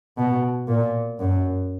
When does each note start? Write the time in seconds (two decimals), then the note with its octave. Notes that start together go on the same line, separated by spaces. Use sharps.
0.17 B2
0.68 A#2
1.19 F#2